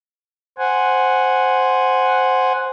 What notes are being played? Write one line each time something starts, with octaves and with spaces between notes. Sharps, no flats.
C5 F#5 G#5